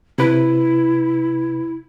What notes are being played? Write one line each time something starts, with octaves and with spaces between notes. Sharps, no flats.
C3 E4 B4